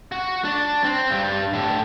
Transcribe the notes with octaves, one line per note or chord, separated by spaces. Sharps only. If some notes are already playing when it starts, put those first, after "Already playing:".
F#4
D4 D5
C4
G2 G3
A2 D3